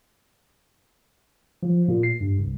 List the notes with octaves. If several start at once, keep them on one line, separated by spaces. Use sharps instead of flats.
F3
A#2
C7
G2
C2